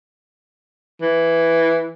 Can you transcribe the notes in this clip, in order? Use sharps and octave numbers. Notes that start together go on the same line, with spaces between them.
E3